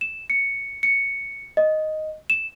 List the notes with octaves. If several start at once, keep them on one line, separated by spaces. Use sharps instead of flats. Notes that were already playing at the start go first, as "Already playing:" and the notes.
E7
C#7
C#7
D#5
E7